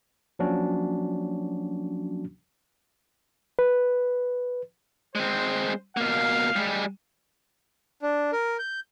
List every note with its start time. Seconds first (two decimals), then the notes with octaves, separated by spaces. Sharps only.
0.39 F3 F#3 A#3 C#4 D4 F#4
3.59 B4
5.15 G#3 C4 C5
5.97 B2 A#3 F5
6.56 G3 G#3
8.02 D4
8.32 A#4
8.59 G6